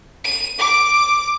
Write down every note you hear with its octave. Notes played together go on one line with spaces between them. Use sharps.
D#7
D6